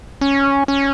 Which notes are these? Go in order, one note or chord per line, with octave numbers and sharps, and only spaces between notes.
C#4
C#4